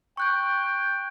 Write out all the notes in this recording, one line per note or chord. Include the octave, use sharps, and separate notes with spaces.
G5 C#6 F#6 G6